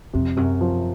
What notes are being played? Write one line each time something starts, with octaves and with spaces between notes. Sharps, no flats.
F2 C3
F#2 C3
F3